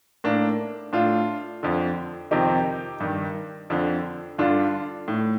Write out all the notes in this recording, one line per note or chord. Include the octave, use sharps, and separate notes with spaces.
A2 A#3 D4
A2 D4 F4
F2 D3
F2 C3 D#3 D#4 G4
G2 D#3
F2 D3
G2 D3 D4 F4
A2